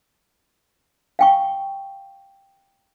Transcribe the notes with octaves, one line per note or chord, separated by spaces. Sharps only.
F5 G5 C#6